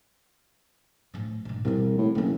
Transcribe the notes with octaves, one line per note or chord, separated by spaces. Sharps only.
A2 F3
G#2 B2
C2 B2 E3
A2
F#1 D#3 E3